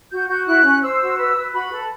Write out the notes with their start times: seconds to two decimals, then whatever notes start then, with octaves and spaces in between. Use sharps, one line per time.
0.11 F#4 G6
0.28 F#4 G6
0.46 E4 F#6
0.64 C#4
0.82 C5 E6
1.01 F#4
1.18 B4
1.36 B4
1.53 F#4 B5
1.71 A4